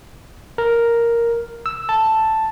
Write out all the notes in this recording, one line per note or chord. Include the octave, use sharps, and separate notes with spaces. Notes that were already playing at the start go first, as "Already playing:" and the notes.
A#4
E6
A5